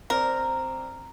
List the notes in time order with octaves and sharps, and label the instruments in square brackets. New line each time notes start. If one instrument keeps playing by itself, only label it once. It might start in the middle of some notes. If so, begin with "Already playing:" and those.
[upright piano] C4 D5 [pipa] A#4